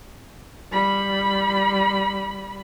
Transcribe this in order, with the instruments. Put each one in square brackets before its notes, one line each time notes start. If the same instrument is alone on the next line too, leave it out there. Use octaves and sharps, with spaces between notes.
[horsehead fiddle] G3 B5